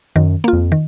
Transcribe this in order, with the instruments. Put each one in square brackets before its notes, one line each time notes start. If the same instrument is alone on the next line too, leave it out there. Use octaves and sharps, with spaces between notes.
[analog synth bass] F#2 [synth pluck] D#3
[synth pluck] A#3 F4
[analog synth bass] F2
[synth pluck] D#3